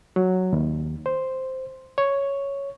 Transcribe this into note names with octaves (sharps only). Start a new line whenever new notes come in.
F#3
D#2
C5
C#5